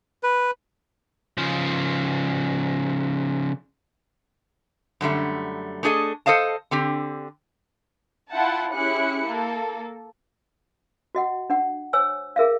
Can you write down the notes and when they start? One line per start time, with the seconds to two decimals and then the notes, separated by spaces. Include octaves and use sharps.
0.23 B4
1.38 C#3 F3
5.01 F#2 D3 G3 A3
5.83 A3 D4 G#4 A4 D#5
6.26 A4 C5 D#5 F5 A5
6.71 D3 C4 G4
8.31 E4 F4 F#5 G5 A5
8.74 C#4 E4 G4 G#4 F#6 C#7
9.24 A#3 A4
11.15 F#4 D#5 F#5
11.50 D4 F#5
11.93 C5 C#5 G#5 E6
12.36 G#4 A#4 E5 F5